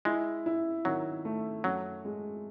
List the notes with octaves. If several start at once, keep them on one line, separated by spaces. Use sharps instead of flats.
G#3 E4
E4
D#3 F#3
A3
F#2 F#3
G#3